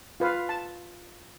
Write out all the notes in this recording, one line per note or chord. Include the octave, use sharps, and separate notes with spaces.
F4 B4 F5
A5